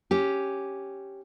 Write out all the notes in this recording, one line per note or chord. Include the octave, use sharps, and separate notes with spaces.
C#4 G4